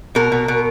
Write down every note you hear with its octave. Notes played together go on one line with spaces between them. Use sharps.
B2 A#4
B2
B2